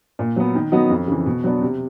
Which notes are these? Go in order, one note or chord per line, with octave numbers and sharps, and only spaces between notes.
A#2
F#3 B3
D#3
F#3 B3 D#4 F#4
F2
C#3 E3
B2
F#3 B3 D4
C3